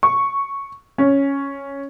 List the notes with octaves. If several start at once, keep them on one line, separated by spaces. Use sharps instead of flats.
C#6
C#4